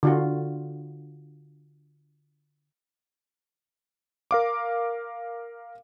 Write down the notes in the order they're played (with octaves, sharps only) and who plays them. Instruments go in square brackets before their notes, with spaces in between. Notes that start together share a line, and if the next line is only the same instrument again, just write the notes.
[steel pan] D3 F4 F#4
[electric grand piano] A#4 F5 D6